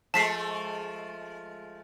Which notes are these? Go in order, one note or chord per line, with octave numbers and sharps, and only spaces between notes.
F3 G#3 A3 A5 B6 C7